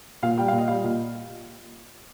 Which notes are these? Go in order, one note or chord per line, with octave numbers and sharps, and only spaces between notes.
A#2 F5
G3 G5
A#2 F5
D#5
G3 F5
A#2